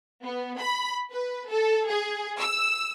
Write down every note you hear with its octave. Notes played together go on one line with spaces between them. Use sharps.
B3
B5
B4
A4
G#4
E6